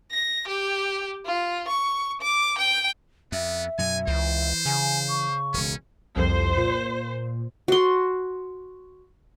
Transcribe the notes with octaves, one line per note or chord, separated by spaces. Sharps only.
A#6
G4
F4
C#6
D6
G5
F2 B3 E5
F#2 B2 F#3 G#5
C#2 E3 C5
C#3 G#5
C#6
E1 C#2 C#4
C2 F2 C5
A#2
F#4 C6